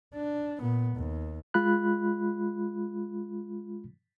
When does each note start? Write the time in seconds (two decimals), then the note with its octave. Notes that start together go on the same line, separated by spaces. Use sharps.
0.14 D4
0.60 A#2 B3
0.96 D#2
1.54 G#3 F4 B5 F#6